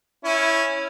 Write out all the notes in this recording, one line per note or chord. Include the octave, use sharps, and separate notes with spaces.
C#4 E4